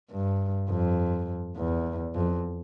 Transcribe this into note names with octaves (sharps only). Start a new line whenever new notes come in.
G2
F2
E2
F2